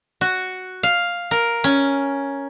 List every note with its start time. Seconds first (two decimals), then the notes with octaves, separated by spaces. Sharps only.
0.21 F#4
0.83 F5
1.31 A#4
1.64 C#4